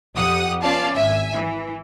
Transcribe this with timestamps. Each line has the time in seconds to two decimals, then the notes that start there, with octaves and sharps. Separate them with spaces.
0.16 F2 G4 F#5 D#6
0.62 B3 C#4 F4 D5 F5 A5
0.94 G#1 E5 G#5
1.34 E3